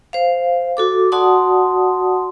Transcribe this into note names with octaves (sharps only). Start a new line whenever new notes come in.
C5 F5
F#4 A4 D6
F#4 D5 F#5 A5 C6 D#6